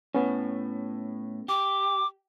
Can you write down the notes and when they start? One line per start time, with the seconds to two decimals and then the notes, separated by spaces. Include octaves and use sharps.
0.15 A2 B3 C#4
1.48 G4 D6